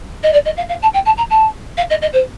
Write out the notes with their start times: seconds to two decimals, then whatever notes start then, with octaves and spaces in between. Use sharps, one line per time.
0.23 D#5
0.33 D5
0.45 D#5
0.57 F5
0.69 F5
0.82 A5
0.94 G5
1.05 A5
1.17 A#5
1.30 A5
1.77 F5
1.90 D#5
2.01 D#5
2.13 C5